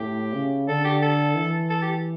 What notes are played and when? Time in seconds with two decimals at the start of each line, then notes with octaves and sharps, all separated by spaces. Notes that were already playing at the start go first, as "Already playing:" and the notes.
Already playing: A2 G4
0.33 C#3
0.68 D3 A4
0.85 G4
1.02 A4
1.36 E3
1.70 A4
1.82 G4